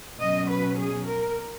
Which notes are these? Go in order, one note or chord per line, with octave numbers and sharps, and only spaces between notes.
B2 F#3 C#4 D#5
B4
G#4
A#4